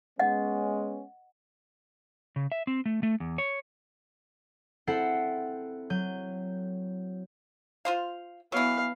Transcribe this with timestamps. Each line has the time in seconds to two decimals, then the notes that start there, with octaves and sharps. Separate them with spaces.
0.19 G#3 B3 C#4 D#5 F#5
2.36 C#3
2.52 E5
2.67 C4
2.86 A3
3.03 A3
3.20 E2
3.38 C#5
4.87 C4 E4 A4 C5 F#5 C7
5.90 F#3 G6 D#7
7.85 F4 C5 F5
8.52 E3 F#3 B3 F5